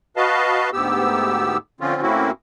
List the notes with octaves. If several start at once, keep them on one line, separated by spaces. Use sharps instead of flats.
F#4 B4 D#5 F5 A5
D2 G#2 B3 G4 E6
D3 F3 C4 C#4 F4
A2 A#3 C4 C#4 E4 F#4